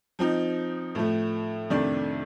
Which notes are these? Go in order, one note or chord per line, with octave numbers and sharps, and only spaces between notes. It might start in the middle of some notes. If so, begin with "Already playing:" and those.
F3 C4 D#4
A2 F3 A3
F2 C3 D#3 A3 D4